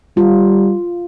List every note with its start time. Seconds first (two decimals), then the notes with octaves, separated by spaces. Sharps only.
0.17 G3 F4